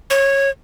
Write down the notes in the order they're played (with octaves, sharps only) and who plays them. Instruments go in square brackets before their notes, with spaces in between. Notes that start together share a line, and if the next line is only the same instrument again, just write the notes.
[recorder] C#5